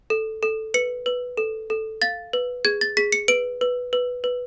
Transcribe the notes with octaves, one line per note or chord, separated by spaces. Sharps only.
A4
A4
B4 C#7
B4
A4
A4
F5 A6
B4
G#4 G#6
A6
G#4 B6
C#7
B4 D7
B4
B4
B4